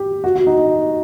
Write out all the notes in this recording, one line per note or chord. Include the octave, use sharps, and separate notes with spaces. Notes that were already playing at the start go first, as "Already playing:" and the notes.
Already playing: G4
F#4
F#4
D#4
D#4